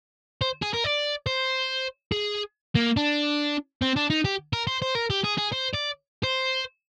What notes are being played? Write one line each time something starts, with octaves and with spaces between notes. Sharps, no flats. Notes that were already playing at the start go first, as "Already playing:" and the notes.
C5
G#4
A#4
D5
C5
G#4
A#3
D4
C4
D4
D#4
G4
A#4
C5
C5
A#4
G4
G#4
G#4
C5
D5
C5